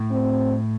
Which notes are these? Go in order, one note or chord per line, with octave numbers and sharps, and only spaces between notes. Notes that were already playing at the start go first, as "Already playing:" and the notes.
Already playing: A2
C4